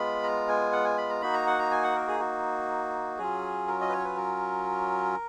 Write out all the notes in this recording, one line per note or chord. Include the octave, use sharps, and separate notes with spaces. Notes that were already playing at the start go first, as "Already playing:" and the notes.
Already playing: G#3 B3 F4 B5
A#5
G#5
F#5
G#5
B5
A#5
A#3 D#4 F#4 B5
A#5
F#5
A#5
G#5
F#5
A#4
G#4
F#4
F#3 C#4 F4 G#4
A#4
D#5
B4
C#5
B4
A#4